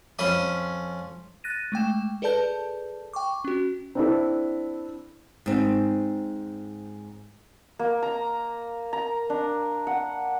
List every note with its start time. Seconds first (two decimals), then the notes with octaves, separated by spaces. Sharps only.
0.19 F2 C#4 C5 B5 C6 D#6
1.44 F#6 A6 A#6 D#7
1.72 G#3 A3 G5 E7
2.22 G#4 A4 B4 D5 A5 G6
3.13 G5 C#6 D6
3.45 C#4 F#4
3.95 C4 D4 E4 A4
5.46 G#2 C4
7.79 A#3
8.03 A#5
8.93 A#5
9.30 D4
9.87 F#5